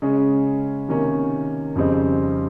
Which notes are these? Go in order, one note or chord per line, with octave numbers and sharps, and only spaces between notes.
C#3 G#3 C#4
C3 D#3 A#3 C#4
F2 C#3 G3 C4 D#4